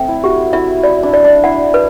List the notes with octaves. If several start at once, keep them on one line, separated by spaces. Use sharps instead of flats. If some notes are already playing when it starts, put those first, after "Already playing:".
Already playing: A3 C4 G5
E4
F#4 G4
E4 E5
E4 D5
D4
D5
D4
E4 F#5
B4